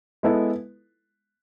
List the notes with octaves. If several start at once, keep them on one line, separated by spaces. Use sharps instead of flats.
G#3 B3 E4 A4